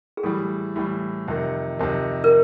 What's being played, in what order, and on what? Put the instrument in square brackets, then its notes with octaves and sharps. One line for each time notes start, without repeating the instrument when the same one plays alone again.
[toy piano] G#4
[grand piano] A2 E3 G3 [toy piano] A4
[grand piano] A2 E3 G3
F2 C3 D#3
F2 C3 D#3
[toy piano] A#4